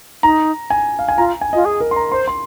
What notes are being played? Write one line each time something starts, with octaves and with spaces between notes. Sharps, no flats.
D#4 A#5
G#5
F5
G#5
F4 A#5
G#5
F4 D#5
G#4 D#5
A#4
C6
A#5
C5 C6
C6